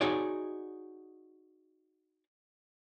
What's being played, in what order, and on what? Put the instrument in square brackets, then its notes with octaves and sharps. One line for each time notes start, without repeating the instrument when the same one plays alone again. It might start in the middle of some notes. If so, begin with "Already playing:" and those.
[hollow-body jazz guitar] D#4 F#4 G#4 C#5 D5